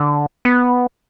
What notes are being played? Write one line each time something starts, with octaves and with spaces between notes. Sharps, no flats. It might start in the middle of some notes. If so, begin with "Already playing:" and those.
Already playing: D3
B3